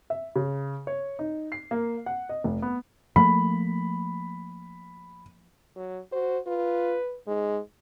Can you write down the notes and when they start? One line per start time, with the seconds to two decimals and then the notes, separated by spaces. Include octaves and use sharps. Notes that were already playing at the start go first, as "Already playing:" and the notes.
0.10 E5
0.36 C#3
0.87 C#5
1.19 D#4
1.52 C7
1.71 A#3
2.06 F#5
2.29 D#5
2.44 F1
2.62 B3
3.16 F3 A3 A#3 B5
5.76 F#3
6.12 F#4 C5
6.47 F4 B4
7.27 G#2 G#3